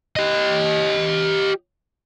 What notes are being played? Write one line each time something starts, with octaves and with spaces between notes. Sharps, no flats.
G4 D#5